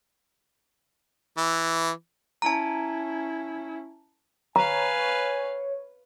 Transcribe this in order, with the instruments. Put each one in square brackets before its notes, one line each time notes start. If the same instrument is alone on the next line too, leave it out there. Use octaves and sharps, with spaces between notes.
[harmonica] E3
[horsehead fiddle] C#4 E4 [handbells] A5 A#5
[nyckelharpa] B4 F5 [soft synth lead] C#5 [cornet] G#5 [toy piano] A#5